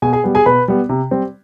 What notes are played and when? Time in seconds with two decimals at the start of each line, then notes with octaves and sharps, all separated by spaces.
0.02 B2 G#4 G#5
0.13 G#4 G#5
0.24 G3 B3
0.35 G#4 G#5
0.46 B2 B4 B5
0.68 G3 B3
0.89 C3
1.11 G3 C4